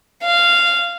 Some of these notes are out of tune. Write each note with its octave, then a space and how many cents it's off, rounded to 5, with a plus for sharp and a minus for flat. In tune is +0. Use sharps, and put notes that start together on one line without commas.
F5 -10